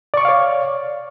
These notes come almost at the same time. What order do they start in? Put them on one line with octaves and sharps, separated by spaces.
D5 C#6 D6 F5 C#5